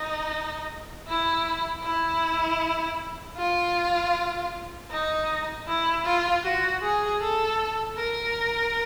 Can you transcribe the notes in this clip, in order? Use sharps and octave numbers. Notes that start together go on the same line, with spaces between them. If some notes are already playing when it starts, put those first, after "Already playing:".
Already playing: D#4
E4
E4
F4
D#4
E4
F4
F#4
G#4
A4
A#4